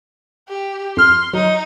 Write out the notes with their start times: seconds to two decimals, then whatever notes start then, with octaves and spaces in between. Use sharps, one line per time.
0.49 G4
0.97 F2 C6 F6
1.33 F#3 D#4